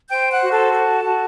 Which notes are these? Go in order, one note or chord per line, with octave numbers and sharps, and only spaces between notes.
C5 G5 G6
F#5 F#6
F#4
A4 A5
A4
F#4